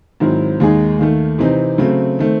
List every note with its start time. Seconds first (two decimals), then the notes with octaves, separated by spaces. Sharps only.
0.20 G#2 D#3 F#3 C4 E4
0.60 D#2 D#3 G#3 D#4 G#4
0.99 D#2 D#3 A3
1.39 C3 E3 C4 D#4
1.78 C#3 F#3 A3 C4
2.19 D#3 A3 C4